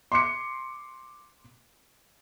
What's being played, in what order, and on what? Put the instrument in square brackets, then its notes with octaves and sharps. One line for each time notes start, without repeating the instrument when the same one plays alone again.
[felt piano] C6 D6 C#7